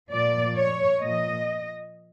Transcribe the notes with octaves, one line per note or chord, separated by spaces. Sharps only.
A#2 F3 D5
C#5
A#2 F3 D#5